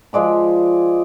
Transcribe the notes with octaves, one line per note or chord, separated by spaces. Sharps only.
F3 G#3 D5 B5